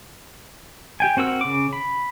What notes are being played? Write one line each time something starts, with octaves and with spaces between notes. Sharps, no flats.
G4 G5 G#5
C4 F#4 A#4 E6
C#3 D6
B5